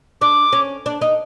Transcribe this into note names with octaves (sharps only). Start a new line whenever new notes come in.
D4 D6
C#4
D4
D#4